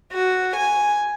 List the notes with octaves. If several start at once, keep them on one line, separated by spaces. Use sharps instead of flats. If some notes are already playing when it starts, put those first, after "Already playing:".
F#4
G#5